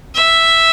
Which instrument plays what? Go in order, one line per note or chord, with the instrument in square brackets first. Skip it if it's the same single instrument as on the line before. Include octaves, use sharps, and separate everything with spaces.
[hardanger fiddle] E5